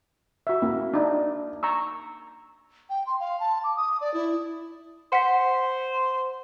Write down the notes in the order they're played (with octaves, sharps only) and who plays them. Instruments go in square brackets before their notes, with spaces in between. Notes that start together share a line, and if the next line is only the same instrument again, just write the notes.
[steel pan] F#4 E5
[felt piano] A#3 [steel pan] E4
[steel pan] D4 D#4
A#5 C#6 E6
[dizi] G5
C6
F5
A5
D6
D#6
D5
E4
[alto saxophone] C5 [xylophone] F#5 B6